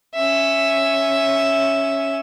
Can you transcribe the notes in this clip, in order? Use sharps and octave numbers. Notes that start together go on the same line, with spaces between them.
C#4 E5